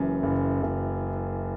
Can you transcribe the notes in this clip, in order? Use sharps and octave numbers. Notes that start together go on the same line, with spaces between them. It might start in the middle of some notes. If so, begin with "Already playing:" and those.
Already playing: F#1 F#2 E3
F#1
F#1